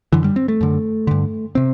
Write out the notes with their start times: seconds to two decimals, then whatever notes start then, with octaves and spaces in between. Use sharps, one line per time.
0.12 F#2 D3 E3
0.24 G3
0.36 C4
0.48 A3
0.61 F#2 D3
1.07 G2 D3
1.55 C3 C4